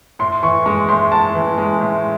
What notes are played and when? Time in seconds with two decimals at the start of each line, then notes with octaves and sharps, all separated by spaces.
0.19 A2 C6
0.43 E3 C#6
0.66 G#3 C#6
0.89 A2 C6
1.12 A2 A5
1.34 E3
1.58 G#3
1.81 A2